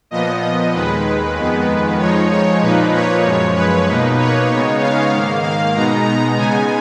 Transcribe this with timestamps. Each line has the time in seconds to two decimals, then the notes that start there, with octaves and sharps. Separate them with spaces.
0.11 A#2 F3 B3 D#5
0.74 D#2 D#3 G#3 B4
1.36 F2 D#3 G#3 B3
1.99 F2 F3 G#3 D#4 C#5
2.31 C#5
2.61 A#2 F3 A#3 D#4 B4
2.93 C#5
3.24 F#2 F3 G#3
3.56 B4
3.87 B2 A#3 D#4
4.18 C#5
4.50 C#3 G#3 B3 D#4
4.81 F5
5.13 G#2 D#3 A#3
5.43 F5
5.75 B2 G#3 B3 D#4 A#5
6.06 A#5
6.37 C#3 G#3 B3 D#4 G#5